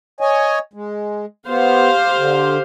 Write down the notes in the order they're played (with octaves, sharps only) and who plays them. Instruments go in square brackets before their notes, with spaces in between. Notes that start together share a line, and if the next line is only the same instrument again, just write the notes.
[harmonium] C#5 D#5 G#5
G#3
[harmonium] B3 [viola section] G4 C5 F5
[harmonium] D3